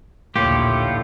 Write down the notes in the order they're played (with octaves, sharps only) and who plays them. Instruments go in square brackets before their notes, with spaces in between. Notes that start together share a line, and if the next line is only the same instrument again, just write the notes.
[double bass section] A#1 D#2 D3 [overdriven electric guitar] A2 [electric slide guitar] A#3 F4 [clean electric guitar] G4